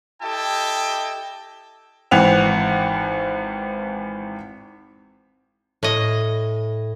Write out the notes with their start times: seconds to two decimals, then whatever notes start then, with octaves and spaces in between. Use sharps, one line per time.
0.23 E4 G4 A4 D#5 G5 A5
2.11 G#1 E3 C4 F#5 F7
5.83 A2 D#5